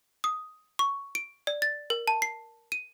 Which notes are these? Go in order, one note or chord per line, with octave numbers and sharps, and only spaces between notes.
D#6
C#6
D7
D5
A6
A#4
A5
C7
D#7